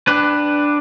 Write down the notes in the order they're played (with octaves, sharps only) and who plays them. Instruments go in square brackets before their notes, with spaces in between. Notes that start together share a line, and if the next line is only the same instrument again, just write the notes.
[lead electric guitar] D4 B4